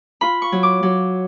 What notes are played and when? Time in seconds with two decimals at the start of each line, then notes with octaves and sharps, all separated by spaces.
0.21 F4 B5
0.42 C#6
0.52 F#3
0.63 D6
0.83 F#3